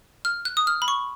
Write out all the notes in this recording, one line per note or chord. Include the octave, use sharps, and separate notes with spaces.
F6
F#6
D#6
F6
B5
C#6